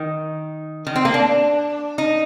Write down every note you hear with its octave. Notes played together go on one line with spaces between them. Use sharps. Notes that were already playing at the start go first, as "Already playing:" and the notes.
Already playing: D#3
D#3
C4
A#3
D4
D#4